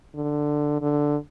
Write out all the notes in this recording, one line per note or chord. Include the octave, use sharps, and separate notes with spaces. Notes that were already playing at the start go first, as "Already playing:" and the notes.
D3
D3